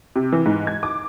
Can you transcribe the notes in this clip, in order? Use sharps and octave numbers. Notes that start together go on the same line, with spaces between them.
C3
E3
G#2
G#6
D6